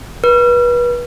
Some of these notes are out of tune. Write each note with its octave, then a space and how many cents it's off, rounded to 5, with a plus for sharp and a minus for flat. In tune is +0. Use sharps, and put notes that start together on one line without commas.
B4 -30